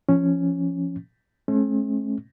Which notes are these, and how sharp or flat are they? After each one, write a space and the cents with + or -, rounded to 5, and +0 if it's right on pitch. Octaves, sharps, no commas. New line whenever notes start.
F3 -15 C#4 +0
A3 -45 C#4 -40